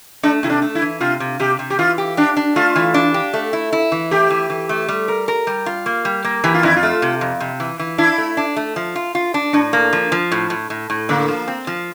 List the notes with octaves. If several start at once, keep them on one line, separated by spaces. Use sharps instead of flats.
A3 D4
C3 E4
D4
A3
E4
E3
C3 F4
C3
C3 G4
C3
G4
E3 F4
G4
D4 G4
D4
A3 F4
E3
D4
G4
A3
E4
E4
E3
A3 G4
E3
E3
A3
G3
A#4
A#4
G3
F4
A#3
G3
A#3
E3 G4
F4
F2 E4
F4
A3
C3
F2
C3
E3
E3
D4 E4
A3
D4
A3
F3
F4
F4
D4
A2 D4
A#3
F3
F3
A2
A2
A2
A2
D3 A#3
F3
C4
F3